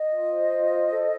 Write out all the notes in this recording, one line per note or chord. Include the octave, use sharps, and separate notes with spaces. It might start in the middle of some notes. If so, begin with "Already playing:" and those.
Already playing: D#5
F4
C5
F4
C5
A4